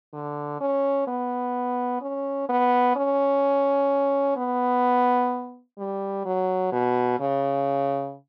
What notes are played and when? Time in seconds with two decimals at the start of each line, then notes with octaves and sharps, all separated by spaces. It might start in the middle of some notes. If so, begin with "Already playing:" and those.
0.13 D3
0.60 C#4
1.07 B3
2.01 C#4
2.49 B3
2.96 C#4
4.37 B3
5.78 G3
6.25 F#3
6.72 B2
7.20 C#3